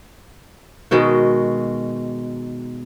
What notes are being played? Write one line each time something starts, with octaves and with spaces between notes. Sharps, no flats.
B2 D#3 G#3 F#4